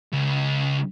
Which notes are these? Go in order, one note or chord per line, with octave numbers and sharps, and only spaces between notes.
C#2